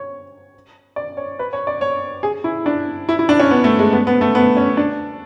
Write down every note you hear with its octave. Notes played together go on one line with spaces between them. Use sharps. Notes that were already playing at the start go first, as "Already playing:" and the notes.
Already playing: C#5
D5
C#5
B4
C#5
D5
C#5
G#4
E4
D4
E4
E4
D4
C#4
B3
A3
G#3
B3
B3
A3
B3
C#4
D4